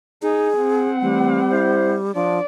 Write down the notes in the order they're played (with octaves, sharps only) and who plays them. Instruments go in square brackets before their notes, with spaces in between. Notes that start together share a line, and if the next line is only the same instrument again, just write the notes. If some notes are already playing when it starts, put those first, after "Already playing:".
[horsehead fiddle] D#4 [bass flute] G#4
[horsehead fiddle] C4 F#5
[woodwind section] E3 A3 [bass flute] G3
[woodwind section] E4 C5
[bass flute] F3 [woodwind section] D4 [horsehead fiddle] D5